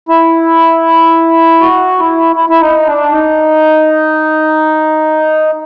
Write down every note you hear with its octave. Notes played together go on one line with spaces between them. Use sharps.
E4
F#4
E4
E4
E4
D#4
D4
D#4